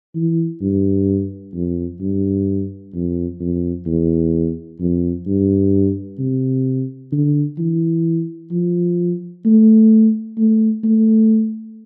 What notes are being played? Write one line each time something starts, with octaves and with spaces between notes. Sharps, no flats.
E3
G2
F2
G2
F2
F2
E2
F2
G2
C3
D3
E3
F3
A3
A3
A3